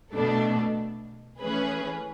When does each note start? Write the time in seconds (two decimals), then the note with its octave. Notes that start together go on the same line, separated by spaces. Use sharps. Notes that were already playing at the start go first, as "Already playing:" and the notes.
0.13 B2 A3 D4 A4
1.41 E3 A3 C#4 G#4 B4